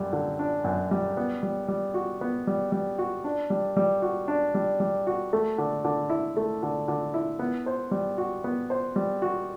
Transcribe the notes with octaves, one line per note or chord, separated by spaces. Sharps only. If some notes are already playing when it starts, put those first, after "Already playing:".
Already playing: F#2 G3
D3
D4
F#2
G3
B3
G3
G3
F#4
B3
G3
G3
F#4
D4
G3
G3
F#4
D4
G3
G3
F#4
A3
D3
D3
E4
A3
D3
D3
E4
B3
C5
G3
F#4
B3
C5
G3
F#4